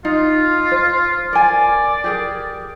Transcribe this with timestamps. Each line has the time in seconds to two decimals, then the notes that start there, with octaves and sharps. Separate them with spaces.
0.05 D#4 F4
0.71 C5
1.33 A#4 D5 G#5
2.04 G4 G#4 A#4